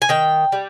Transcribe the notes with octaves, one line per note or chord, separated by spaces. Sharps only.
G#5
D#3 G5
G3